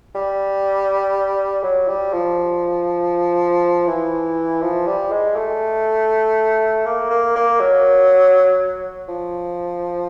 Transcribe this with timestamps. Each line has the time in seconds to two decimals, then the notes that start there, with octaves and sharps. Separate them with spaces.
0.15 G3
1.63 F#3
1.88 G3
2.13 F3
3.87 E3
4.61 F3
4.87 G3
5.11 G#3
5.36 A3
6.86 A#3
7.10 A#3
7.36 A#3
7.60 F#3
9.09 F3